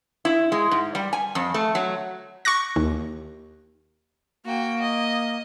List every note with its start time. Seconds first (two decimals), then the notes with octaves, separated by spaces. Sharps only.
0.25 E4
0.52 G#3
0.71 G#2
0.95 G3
1.13 G#5
1.35 F2
1.54 A3
1.75 F#3
2.45 C#6 D6 F#6 A#6
2.76 D#2
4.44 A#3 F#4 G5
4.82 D#5